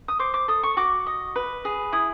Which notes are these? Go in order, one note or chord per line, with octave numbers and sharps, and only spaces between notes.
D#6
C5 D6
D6
A4 D#6
C#6
F#4 D6
D#5
B4
G#4
E4 D#6